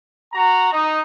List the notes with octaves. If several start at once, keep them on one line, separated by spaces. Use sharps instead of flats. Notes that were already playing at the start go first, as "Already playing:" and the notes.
F#4 A#5
D#4